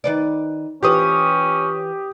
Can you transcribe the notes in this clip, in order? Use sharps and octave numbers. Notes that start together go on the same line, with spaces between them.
D#3 B4 D5
E3 C#4 F4 G4 B4 D#6